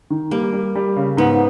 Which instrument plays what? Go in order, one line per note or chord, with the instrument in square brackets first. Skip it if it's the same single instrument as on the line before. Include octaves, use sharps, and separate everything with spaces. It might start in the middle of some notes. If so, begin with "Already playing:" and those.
[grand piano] D#3
[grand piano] G3 [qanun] A#3
[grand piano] G3
G3
C#3
[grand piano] G#2 [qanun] B3